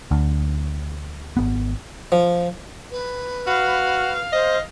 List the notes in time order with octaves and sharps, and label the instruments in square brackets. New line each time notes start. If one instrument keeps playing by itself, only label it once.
[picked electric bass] D2
G#1 B3
[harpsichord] F3
[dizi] B4
[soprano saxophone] F#4 [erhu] F5
[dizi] C5 [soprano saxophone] D#5